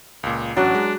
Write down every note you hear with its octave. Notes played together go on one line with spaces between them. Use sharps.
C#2 A#2
A1 F#3 C#4 D4 F#6
G#3